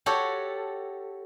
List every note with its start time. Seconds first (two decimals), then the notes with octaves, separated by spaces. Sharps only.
0.06 F#4 G4 A4 C#5